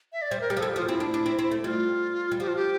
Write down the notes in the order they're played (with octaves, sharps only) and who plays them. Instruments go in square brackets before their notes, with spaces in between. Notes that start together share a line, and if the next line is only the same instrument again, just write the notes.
[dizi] E5
D5
[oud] G3 [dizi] C5
[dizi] A#4
[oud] G3 [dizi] G4
[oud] F3
[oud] G3 [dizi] A4
[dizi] G4
[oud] F3
[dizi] F4
[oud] C4 [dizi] E4
[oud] D4
D4
C4
C4
A3
[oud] G3 [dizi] F4
[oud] G3
[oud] F3 [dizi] G4
[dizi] F4
G4